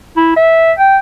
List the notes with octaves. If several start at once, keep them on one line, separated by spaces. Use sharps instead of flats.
E4
E5
G5